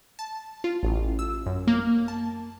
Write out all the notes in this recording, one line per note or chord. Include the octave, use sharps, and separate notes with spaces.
A5
F4
A1
E6
F#2
A#3
A5